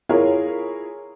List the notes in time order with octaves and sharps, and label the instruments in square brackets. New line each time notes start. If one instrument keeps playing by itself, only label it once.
[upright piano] E4 F4 G#4 A#4 C#5